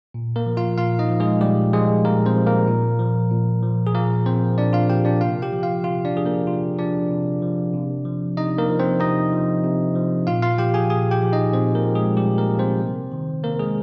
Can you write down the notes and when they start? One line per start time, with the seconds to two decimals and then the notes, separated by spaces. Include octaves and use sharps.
0.14 A#2
0.36 A#3 A#4
0.46 F3
0.57 F4 F5
0.78 A#2 F4 F5
0.99 D#4 D#5
1.10 F3
1.20 G#3 G#4
1.41 A#2 G3 G4
1.73 F3 G#3 G#4
2.05 A#2 A#3 A#4
2.26 C4 C5
2.36 F3
2.47 A#3 A#4
2.67 A#2
2.99 F3
3.31 A#2
3.63 F3
3.87 G#4
3.94 A#2 A#3 A#4
4.26 F3 C4 C5
4.58 A#2 D4 D5
4.73 F4 F5
4.89 F3 G4 G5
5.05 D4 D5
5.21 C3 F4 F5
5.42 G4 G5
5.53 F3
5.63 F4 F5
5.84 C3 F4 F5
6.05 D4 D5
6.15 F3 G#4
6.26 A#3 A#4
6.47 C3 F4
6.78 F3 D4 D5
7.11 C3
7.42 F3
7.74 C3
8.05 F3
8.37 C3 D#4 D#5
8.58 A#3 A#4
8.68 F3
8.79 C4 C5
9.00 C3 D#4 D#5
9.33 F3
9.64 C3
9.96 F3
10.27 A#2 F4 F5
10.42 F4 F5
10.58 F3 G4 G5
10.74 G#4 G#5
10.90 A#2 G#4 G#5
11.11 G4 G5
11.22 F3
11.32 D#4 D#5
11.53 A#2 C4 C5
11.75 A#3 A#4
11.85 F3
11.95 G#3 G#4
12.17 A#2 G3 G4
12.38 A#3 A#4
12.48 F3
12.59 C4 C5
12.80 C3
13.12 D#3
13.43 C3 A#3 A#4
13.59 G#3 G#4